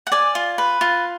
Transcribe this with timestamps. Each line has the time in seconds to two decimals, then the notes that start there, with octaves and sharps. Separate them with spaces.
0.07 F#5
0.12 D5 G#5
0.35 F4
0.58 B4
0.81 F4